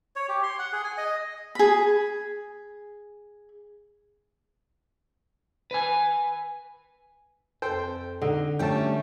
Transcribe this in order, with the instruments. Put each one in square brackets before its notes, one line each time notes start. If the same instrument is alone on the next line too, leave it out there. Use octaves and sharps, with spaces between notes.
[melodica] C#5
G4
C6
F#5
G#4
G#5
D#5
[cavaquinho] G#4 B5
[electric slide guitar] B4 G#5
[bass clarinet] F2 [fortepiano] A4 C5 G5
[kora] D3 [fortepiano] D#4
[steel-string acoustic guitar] G3 C#4 [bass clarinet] A3 [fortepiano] G5 A5